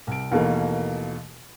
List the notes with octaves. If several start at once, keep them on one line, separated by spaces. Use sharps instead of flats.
C2 D7
D#2 B2 E3 A3 A#3